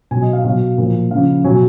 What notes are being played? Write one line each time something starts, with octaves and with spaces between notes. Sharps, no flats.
B2 F#3 G#5
D#5
F5
B2 F#3 F5
A#2 F3
C#3 F3 F5
B2 F#3 G#5